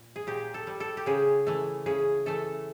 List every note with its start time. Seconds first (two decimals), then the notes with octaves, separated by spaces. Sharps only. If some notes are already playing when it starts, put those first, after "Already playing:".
Already playing: A#2
0.16 G#4
0.27 A#2 G4
0.54 A4
0.67 G3
0.80 A4
0.97 G4
1.06 C#3 G#4
1.47 E3 A3
1.86 C#3 G#4
2.26 E3 A3 A4